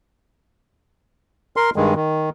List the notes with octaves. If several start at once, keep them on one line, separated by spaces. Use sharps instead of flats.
A#4 C6
G2 D#3 G#3
D#3